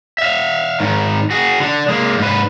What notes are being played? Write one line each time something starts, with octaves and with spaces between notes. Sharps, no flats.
E5 F5
G#2 D#3
F#4 G#4
D3 D4
G#3 A#3
G#2 B4